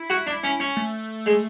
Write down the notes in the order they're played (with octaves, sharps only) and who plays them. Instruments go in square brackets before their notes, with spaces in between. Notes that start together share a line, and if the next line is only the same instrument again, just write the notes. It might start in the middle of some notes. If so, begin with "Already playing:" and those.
Already playing: [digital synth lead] E4
[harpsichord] F#4
D4
C#4
C#4
[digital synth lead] A3
[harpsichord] G#3